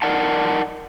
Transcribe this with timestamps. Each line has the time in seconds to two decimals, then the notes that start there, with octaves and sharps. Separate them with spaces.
0.02 D#4 A#4 D5 F#5 A5